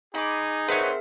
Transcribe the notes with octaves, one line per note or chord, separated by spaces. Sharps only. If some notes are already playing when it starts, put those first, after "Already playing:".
D#4 G#4 B5 D6
C4 G#4 A#4 B4 C#5 E5 F#5 C6